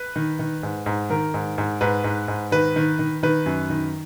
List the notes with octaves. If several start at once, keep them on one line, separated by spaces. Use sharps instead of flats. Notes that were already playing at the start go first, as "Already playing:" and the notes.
Already playing: B4
D#3
D#3
G#2
G#2
D#3 A#4
G#2
G#2
G#2 B4
G#2
G#2
D#3 B4
D#3
D#3
D#3 B4
F#2
D#3